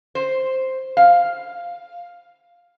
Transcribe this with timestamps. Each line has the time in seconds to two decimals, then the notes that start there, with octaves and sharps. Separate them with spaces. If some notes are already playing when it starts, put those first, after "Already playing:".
0.15 C5
0.97 F5